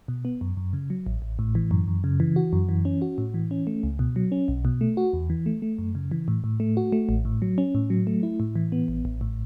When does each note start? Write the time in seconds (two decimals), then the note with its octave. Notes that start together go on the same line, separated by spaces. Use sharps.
0.08 B2
0.25 B3
0.41 F#2
0.57 F#2
0.73 C#3
0.90 F#3
1.07 A1
1.22 A1
1.39 A2
1.55 E3
1.71 F#2
1.87 F#2
2.04 C#3
2.20 E3
2.36 F#4
2.53 F#2
2.69 E3
2.85 C#4
3.02 F#4
3.18 A2
3.34 E3
3.51 C#4
3.67 A3
3.83 C#2
3.99 B2
4.16 F#3
4.32 C#4
4.48 B1
4.65 B2
4.81 A3
4.97 F#4
5.13 E2
5.30 E3
5.46 A3
5.62 A3
5.79 F#2
5.95 C#3
6.11 E3
6.28 A2
6.44 A2
6.60 A3
6.77 F#4
6.92 A3
7.09 A1
7.25 A2
7.42 F#3
7.58 C#4
7.75 A2
7.90 F#3
8.07 A3
8.23 E4
8.40 A2
8.56 E3
8.72 B3
8.88 A1
9.05 A1
9.21 A2